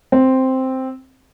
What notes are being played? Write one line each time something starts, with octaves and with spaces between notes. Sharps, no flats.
C4